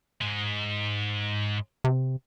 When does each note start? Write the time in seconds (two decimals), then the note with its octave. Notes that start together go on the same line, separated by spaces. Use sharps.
0.21 G#2 G#3
1.84 C3